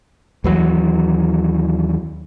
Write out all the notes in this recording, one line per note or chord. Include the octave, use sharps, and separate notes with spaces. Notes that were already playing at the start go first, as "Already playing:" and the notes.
D#2 E3 F#3